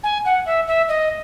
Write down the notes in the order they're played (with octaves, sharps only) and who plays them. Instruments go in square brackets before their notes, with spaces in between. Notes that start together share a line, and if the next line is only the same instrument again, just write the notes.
[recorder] G#5
F#5
E5
E5
D#5